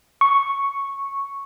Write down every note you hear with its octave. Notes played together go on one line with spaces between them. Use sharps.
C#6